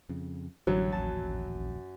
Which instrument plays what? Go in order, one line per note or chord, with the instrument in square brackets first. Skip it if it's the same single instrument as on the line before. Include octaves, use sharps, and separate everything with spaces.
[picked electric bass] F2 C#3
[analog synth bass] A1 [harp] F#2 [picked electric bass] D3 G3 [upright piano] F#3
[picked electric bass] D#1 A#1 [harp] A5